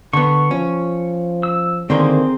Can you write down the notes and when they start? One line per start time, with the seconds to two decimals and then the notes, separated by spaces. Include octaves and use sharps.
0.13 D3 B3 C#6
0.51 F3 C#4
1.43 E6
1.90 D3 D#3 A#3 C4 G#4 C5 C6